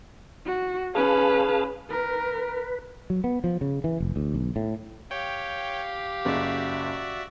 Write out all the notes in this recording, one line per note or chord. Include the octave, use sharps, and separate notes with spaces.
F#4
C#4 G#4 B4 F5 A5
A#4 B4
F#3
B3
F3
C#3
E3
F1
D2
B1
A2
G4 C#5 F5 G5
F#1 F#4 D5 E5